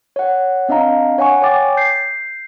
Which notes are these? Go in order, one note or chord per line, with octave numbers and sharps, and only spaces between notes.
C#5 F#5
C4 D4 D#5 F5 A#5
C#5 F#5 G#5 C#6
C#5 G5 G#5 D6 A6
G6 C7